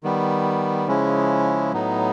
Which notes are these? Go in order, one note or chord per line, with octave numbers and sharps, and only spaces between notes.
D#3 G3 B3
C#3 F3 G#3 C#4 E4
A2 F#3 B3 D#4